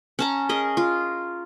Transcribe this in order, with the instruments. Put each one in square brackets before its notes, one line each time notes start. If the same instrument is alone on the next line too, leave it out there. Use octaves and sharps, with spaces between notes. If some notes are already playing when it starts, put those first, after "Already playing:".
[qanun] C#4 A5 A#5
G#4 A#4 D#5
F4